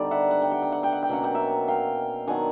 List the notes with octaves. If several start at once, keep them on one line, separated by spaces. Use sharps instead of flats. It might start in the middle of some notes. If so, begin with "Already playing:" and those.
Already playing: D3 G3 B3 D#4 D5
E5 F#5
F#5
G5
F#5
G5
F#5
G5
F#5
G5
B2 F#3 A#3 C#4 F#5
G5
E5 F#5
F5 G5
D#3 F#3 B3 D4 F#5 G#5